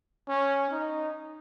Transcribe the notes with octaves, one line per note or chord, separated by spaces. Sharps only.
C#4
D#4